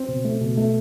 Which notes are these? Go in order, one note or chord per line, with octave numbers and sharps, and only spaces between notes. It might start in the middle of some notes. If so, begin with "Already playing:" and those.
Already playing: C4
B2
A3
B2
A3